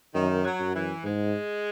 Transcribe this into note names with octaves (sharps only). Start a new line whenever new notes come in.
F#2 D#3
F#3
F#2
E3
G#2 G#3